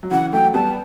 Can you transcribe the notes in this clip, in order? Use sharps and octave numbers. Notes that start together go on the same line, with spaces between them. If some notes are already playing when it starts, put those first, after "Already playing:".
F#3
C#3 E3 F#5
F#3 A3 G5
G3 B3 A5